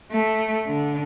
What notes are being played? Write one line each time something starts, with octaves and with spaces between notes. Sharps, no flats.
A3
D3